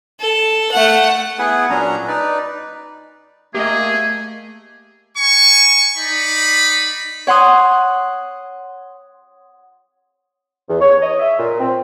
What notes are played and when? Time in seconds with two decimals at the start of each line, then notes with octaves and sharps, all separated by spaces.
0.20 A4
0.71 A3 F#5
1.39 B3 E4 G#4 B4 F#5 G#5
1.70 A#2 F#3 C#4 D4 A#5
2.08 D#4 B4 D5
3.55 A3 A#3 G4 G#4 D#5
5.17 G#5 C#6
5.97 D#4 D5 B5
7.27 C#5 F#5 C6 D#6
10.68 E2
10.81 C#5
11.01 D#5
11.20 E5
11.39 A#2
11.59 C4